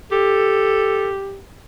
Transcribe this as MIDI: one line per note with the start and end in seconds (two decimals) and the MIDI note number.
0.12 1.38 67
0.12 1.11 69